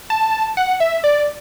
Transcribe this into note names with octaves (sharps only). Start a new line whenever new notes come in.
A5
F#5
E5
D5